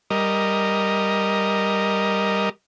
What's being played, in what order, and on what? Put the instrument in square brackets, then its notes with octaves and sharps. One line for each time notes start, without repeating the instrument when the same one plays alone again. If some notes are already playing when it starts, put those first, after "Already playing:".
[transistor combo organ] G3 A#4 D#5